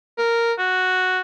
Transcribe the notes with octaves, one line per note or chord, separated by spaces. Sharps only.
A#4
F#4